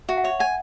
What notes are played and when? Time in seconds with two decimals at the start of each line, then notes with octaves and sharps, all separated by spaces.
0.09 F#4 E5
0.18 F#5
0.24 C#5 E5
0.40 F#5 G#5